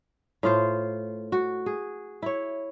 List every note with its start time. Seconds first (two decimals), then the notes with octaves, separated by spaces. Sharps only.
0.43 A2 F4 C5
1.32 F#4
1.66 G#4
2.22 E4 C#5